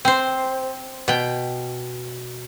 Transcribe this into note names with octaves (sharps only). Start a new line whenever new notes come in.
C4 C5
B2 G5